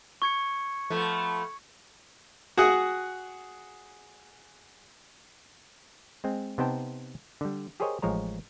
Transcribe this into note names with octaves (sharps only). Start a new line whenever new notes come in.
C#6 G#6 C#7
F3 A3 B3
F#4 G#4 F#5 D#6
G#3 C4
C3 B3 D#4 C5 G5 A5
D3 G3
G4 G#4 A#4 C5 C#5 D#5
A1 F3 G#3 C#5 A#5